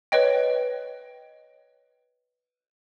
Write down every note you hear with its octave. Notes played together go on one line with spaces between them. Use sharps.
B4 C#5 D#5 G5